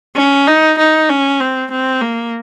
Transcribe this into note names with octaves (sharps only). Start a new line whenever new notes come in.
C#4
D#4
D#4
C#4
C4
C4
A#3